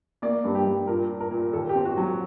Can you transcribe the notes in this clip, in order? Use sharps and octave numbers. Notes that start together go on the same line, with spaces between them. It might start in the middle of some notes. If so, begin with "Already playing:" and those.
A#3 D5
G2
G4
G2
A#2 A#4
A#2
A#4
A#2
D#2 A4
G4
C4
F#4
F#3 F#4